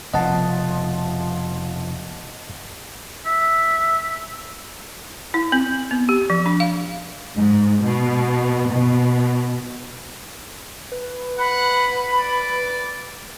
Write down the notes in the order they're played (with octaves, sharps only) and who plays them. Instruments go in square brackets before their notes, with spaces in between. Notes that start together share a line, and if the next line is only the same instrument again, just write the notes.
[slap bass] F1 B2 [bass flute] F3 [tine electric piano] D#5 F#5 A5
[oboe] E5
[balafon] E4
C4
B3
G4
F3
D4
F5
[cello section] G#2
B2
B2
[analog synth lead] B4
[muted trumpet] F#5 [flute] B5
[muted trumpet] D5